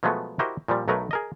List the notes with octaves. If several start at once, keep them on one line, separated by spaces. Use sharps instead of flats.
B2 F3 F#3 G#3 A3 B3
E4 F#4 G4 A#4 C5 D#5
A#2 F3 G3
B1 F#3 A3 D#4 A#4 B4
G#4 A#4 D#5